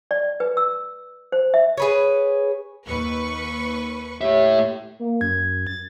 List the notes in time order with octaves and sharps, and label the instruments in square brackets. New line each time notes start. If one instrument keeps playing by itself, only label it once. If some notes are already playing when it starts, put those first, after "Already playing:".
[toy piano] D5
B4
E6
C5
E5
[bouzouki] G#4 B4 C#5
[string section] D#2 B4 C#6
[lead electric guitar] A2 E5 [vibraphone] G4 C#5
[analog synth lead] A#3
[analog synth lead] F#2 [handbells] G#6
[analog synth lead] A6